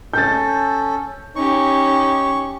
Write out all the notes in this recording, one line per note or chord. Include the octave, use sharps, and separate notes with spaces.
C#4 A4 G6 A6
C#4 D#4 G4 C#6